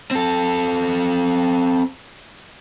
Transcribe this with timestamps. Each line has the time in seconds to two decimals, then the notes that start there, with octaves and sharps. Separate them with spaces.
0.11 C4 A4